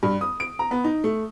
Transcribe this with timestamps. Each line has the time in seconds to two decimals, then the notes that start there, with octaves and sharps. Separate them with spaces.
0.03 G2
0.21 D#6
0.40 D7
0.59 A#5
0.71 B3
0.84 D#4
1.04 A3